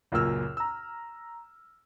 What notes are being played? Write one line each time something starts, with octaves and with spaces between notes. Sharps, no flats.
C#2 F#2 A#2 A#4 E6 F6
A#5 E6